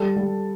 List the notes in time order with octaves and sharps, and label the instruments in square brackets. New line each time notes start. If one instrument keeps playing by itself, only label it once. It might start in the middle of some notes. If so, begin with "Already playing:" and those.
Already playing: [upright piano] G3 A4
G3